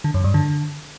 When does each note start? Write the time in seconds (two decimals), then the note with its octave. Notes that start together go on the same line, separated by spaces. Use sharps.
0.04 D3
0.14 F#2
0.24 G2
0.34 D3